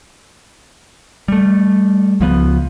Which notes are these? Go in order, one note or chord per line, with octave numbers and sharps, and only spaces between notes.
G3 A3
C#2 F3 B3